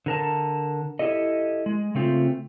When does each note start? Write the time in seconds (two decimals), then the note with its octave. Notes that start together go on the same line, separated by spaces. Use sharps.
0.06 D3 A#4 A5
0.99 E4 G4 A4 D#5
1.66 G#3
1.95 C#3 A3 C4 F4